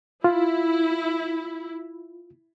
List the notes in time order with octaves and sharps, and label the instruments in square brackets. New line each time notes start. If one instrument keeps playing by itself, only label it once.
[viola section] E4 [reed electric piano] F4